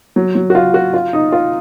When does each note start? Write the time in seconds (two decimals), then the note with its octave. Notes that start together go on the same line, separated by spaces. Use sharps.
0.16 F#3
0.35 F#3
0.50 F#4
0.55 F4
0.74 F#4
0.94 F4
1.13 D#4
1.32 F4